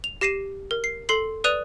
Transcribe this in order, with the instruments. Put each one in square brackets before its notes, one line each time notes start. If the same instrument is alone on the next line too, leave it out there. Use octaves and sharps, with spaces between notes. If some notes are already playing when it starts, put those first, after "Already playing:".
[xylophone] F7
G4 A#6 C7 D#7 E7
A#4
C7
A4 C6 C7 F#7
B4 D5 D#6 F#6 D#7 F7